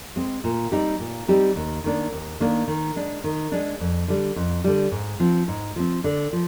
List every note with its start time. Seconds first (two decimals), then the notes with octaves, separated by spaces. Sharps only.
0.16 G#3 C4
0.44 A#2
0.72 G3 C4 D#4 G4
1.00 A#2
1.28 G3 C4 D#4 G4
1.56 D#2
1.84 D#3 A#3 D4
2.12 D#2
2.40 D#3 A#3 D4
2.68 D#3
2.96 G#3 D4
3.24 D#3
3.52 G#3 D4
3.80 F2
4.08 D3 G3
4.36 F2
4.64 D3 G3
4.91 G#2
5.20 F3 C4
5.48 G#2
5.76 F3 C4
6.04 D3
6.33 F3